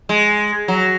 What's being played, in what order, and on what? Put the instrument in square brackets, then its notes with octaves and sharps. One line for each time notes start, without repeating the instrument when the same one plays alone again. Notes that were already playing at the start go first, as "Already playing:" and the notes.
[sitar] G#3
F#3